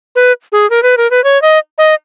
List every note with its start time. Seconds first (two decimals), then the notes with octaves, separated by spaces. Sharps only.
0.16 B4
0.52 G#4
0.70 A#4
0.83 B4
0.97 A#4
1.11 B4
1.24 C#5
1.42 D#5
1.78 D#5